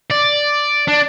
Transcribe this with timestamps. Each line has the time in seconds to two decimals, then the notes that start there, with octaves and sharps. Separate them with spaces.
0.10 D5
0.88 D4